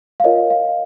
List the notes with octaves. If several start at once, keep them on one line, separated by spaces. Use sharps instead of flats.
F5
F4 A#4 C#5 D#5
F5